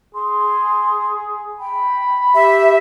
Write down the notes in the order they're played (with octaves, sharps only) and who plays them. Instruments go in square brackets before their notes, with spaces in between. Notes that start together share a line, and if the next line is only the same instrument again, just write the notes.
[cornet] G#4 [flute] C6
[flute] G5 [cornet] B5
[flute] G4 [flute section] E5